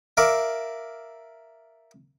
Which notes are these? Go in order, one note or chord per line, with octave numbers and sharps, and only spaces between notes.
A#4 D5 E5 F5